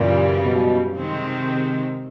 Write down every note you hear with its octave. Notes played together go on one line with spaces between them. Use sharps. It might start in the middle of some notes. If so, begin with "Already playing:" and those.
Already playing: F#2 A#2 C#3 E3 G3
B2
C3 D#3 G#3 C4